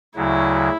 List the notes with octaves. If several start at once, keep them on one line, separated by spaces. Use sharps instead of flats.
D2 C#3 F#3 E4